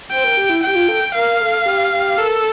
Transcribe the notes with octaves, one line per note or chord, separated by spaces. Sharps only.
C5 G5
A#4
G4
E4
G4 G5
F4
A4
A#4 F5
A4
A4
G4
G4
A4 A#4